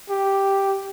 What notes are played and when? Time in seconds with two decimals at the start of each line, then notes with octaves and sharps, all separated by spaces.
0.10 G4